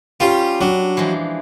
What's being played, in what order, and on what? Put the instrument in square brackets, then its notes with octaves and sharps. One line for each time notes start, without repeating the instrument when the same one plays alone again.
[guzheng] G3 C#4 [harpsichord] F4 G4
[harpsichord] F#3 [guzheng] D4
[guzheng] E3 F3 G#3